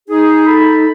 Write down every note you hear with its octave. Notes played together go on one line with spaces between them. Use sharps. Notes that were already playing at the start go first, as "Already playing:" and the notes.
D#4 G#4
A4 B5